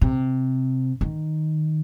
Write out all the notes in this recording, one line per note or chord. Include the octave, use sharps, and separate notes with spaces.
C3
D#3